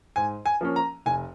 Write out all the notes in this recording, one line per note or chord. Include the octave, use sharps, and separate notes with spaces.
G#2 G#5
G#5
F3 A#3 C#4
A#5
F1 G#5